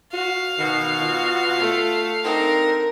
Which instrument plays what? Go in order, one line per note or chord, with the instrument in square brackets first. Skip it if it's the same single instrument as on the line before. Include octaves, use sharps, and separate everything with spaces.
[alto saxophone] F#4 [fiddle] F5
[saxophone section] B2 F#4 [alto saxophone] D#3
[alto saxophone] F4
[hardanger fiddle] A3
[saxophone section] C4 D4 D#4 [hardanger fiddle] A#4